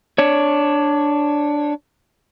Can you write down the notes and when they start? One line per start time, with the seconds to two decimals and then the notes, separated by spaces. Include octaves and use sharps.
0.18 D4 C#5